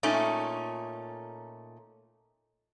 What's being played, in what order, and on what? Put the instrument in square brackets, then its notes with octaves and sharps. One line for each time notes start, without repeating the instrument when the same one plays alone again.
[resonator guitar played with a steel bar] A#2 A3 C#4 D#4